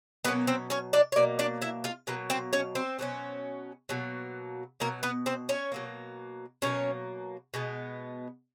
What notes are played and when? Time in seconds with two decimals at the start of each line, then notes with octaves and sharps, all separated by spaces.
0.24 B2 F#3 A#3 B3 C#4 B4
0.47 C4 C5
0.70 C#4 C#5
0.93 D4 D5
1.12 C#5
1.16 B2 F#3 A#3 D5
1.39 D4 D5
1.62 E4 E5
1.84 F4 F5
2.07 B2 F#3 A#3 B4
2.30 C4 C5
2.53 C#4 C#5
2.75 C4 C5
2.99 B2 F#3 A#3 C#4
3.89 B2 F#3 A#3
4.80 B2 F#3 A#3 A#4
5.03 B3 B4
5.26 C4 C5
5.49 C#4 C#5
5.72 B2 F#3 A#3
6.62 B2 F#3 A#3 C#4 C#5
7.54 B2 G#3 B3